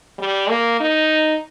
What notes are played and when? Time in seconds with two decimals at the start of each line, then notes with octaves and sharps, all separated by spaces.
0.19 G3
0.49 A#3
0.80 D#4